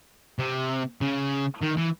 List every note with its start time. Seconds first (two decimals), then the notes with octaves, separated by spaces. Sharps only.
0.39 C3
1.01 C#3
1.63 D#3
1.78 E3